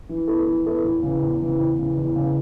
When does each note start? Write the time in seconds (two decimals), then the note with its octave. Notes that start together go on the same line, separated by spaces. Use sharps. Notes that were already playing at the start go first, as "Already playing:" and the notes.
0.09 E3
0.28 B3 E4 A4
0.47 E3
0.66 B3 E4 A4
0.84 E2
1.03 C#3 E3
1.23 E2
1.41 C#3 E3
1.59 E2
1.79 C#3 E3
1.97 E2
2.16 C#3 E3